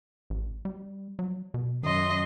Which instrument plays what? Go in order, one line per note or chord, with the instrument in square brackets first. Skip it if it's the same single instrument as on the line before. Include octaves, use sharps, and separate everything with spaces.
[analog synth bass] A1
G3
F#3
B2
[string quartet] F#2 D#5 C6 [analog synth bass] D#3